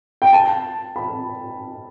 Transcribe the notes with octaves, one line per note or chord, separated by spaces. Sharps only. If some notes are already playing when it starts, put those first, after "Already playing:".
G5
A5
B5